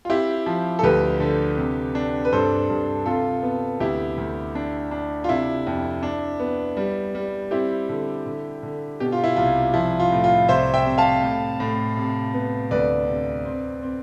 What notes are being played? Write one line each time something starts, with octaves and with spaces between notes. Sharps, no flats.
F4
C4 E4 G4
F3
A4
D2 G4 B4
D3
C3
D4
B4
G2 A4 C5
G2
C3 F4 A4
B3
D2 E4 G4
D2
D4
D4
F4
C3 E4
F2
D4
B3
G3
G3
C4 E4 G4
D3
D3
D3
B2 G4
F4
E4
C2 F4
F3 E4
F4
A2
F4
C2 C5 E5
E5 G5
C3
F5 A5
A2
A2
C3
B3
D2 B4 D5
C3
C4
C4